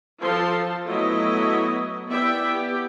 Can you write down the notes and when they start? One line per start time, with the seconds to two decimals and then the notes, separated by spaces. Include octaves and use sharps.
0.21 F3 F4 A4 A5 C6
0.87 F#3 A3 B3 E4 D#5
2.08 B3 E4 G4 D5 E5 G5
2.46 B3 G4